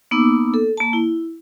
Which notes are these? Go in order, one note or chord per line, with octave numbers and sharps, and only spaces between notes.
A#3 B3 D#4 D6 E6
A4
A#3 A5
E4